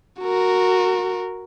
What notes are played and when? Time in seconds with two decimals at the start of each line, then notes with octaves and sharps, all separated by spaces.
0.20 F#4 A#4